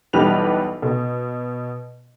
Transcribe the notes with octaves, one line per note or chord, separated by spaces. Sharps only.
B1 E3 G3 B4 F7
B2